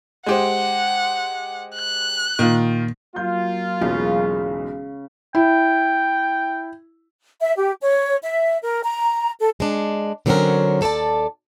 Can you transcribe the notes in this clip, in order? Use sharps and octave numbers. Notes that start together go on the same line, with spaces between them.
G#3 G4 C5 F#5
F#6
A#2 D#3 F4
F#3 A#3 F4 G6
E1 B1 C#3
E4 G5
E5
G4
C#5
E5
A#4
A#5
A4
G#3 D4
D3 F#3 A#3 C4 C#4 A#4
D#2 A4 C#5 D5 A5